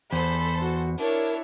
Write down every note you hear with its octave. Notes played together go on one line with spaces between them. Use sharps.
E2 A4 C5 B5
F#4
D4 E4 A#4 C#5